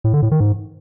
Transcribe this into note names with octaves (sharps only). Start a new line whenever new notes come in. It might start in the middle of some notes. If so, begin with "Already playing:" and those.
A2
D3
A2
D#3
G#2